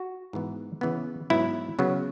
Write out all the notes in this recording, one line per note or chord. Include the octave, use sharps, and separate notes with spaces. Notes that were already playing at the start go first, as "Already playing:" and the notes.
Already playing: F#4
G#2 E3 B3
C#3 E3 B3
G#2 F#3 B3 E4
C#3 F#3 B3